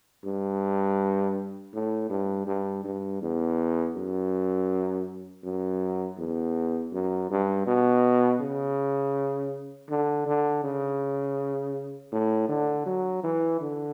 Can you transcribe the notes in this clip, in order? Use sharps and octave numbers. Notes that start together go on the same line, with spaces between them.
G2
A2
G2
G2
G2
E2
F#2
F#2
E2
F#2
G2
B2
C#3
D3
D3
C#3
A2
D3
F#3
E3
D3